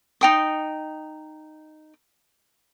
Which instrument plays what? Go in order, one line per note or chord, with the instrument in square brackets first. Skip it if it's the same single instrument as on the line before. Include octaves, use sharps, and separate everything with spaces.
[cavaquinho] D#4 G5 D#6